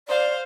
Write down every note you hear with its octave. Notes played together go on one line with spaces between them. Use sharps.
C5 D5 F5